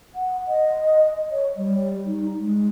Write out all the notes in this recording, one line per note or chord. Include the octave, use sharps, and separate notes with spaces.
F#5
D#5
C#5
G3
D#4
G#3